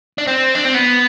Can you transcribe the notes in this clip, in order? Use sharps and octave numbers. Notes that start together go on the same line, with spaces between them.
D4
C4
D4
C4
B3